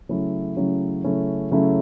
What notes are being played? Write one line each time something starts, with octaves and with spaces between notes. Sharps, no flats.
C#3 F#3 A3 C#4 E4
C#3 F#3 A3 C#4 E4
C#3 F#3 A3 C#4 E4
C#3 F#3 A3 C#4 E4